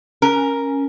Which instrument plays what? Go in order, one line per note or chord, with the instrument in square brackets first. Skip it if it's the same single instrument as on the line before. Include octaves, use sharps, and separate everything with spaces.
[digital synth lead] C#4 [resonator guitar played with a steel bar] A#4